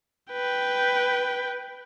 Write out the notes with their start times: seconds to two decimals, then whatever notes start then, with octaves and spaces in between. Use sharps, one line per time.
0.33 B4 G5